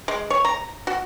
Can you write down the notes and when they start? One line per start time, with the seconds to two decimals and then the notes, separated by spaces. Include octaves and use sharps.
0.08 G#3
0.30 C#5
0.45 A#5
0.87 F#4